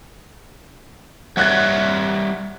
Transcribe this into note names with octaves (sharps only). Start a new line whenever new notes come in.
G3 C#5 E5 F#5 F#6 G#6